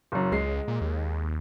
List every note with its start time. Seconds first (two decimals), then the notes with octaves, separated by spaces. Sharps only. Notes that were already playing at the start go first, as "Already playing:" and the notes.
0.12 F#1 F#2
0.32 C#2 G#3 C7
0.68 A#2
0.81 D#2